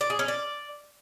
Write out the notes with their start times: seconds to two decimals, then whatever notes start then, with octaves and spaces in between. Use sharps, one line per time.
0.01 D5
0.10 G#4
0.19 C#4
0.28 D5